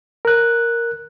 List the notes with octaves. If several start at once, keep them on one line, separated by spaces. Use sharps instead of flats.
A#4 F#6